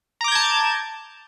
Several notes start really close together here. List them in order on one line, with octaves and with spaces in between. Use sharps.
A#5 D6 G6 G#6 A5